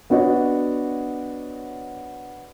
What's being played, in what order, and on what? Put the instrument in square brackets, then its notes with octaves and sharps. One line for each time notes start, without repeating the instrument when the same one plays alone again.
[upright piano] B3 D4 F#4 C#5 D#5